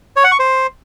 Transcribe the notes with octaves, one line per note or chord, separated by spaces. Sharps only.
C#5
F#5
C#6
C5